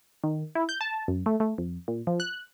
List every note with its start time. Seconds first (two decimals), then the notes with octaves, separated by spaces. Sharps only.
0.24 D#3
0.55 E4
0.69 G6
0.81 A5
1.08 F#2
1.26 A3
1.40 A3
1.58 F2
1.88 A#2
2.07 F3
2.20 F#6